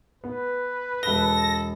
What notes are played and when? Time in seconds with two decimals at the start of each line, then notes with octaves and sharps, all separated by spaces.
0.24 B3 B4
1.03 E1 A4 A#6 G7